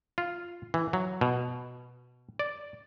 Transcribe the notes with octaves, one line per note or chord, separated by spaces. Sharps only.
F4
E3
F#3
B2
D5